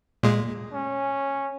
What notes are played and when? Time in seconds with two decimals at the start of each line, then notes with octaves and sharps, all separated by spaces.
0.23 A#2 G#3
0.73 C#4